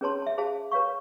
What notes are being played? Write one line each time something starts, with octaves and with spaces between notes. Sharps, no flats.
C#4 G#4 B4 C#5 A5 C6
E5 A5
G#4 C5 F5 A5
B4 C#5 F5 C#6